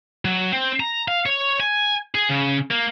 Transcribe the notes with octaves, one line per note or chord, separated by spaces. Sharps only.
F#3
C4
A#5
F5
C#5
G#5
G#4
C#3
A#3